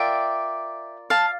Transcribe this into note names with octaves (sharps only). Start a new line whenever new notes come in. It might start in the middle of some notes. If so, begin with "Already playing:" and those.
Already playing: F4 A#4 D5 E5 G5
F5 A5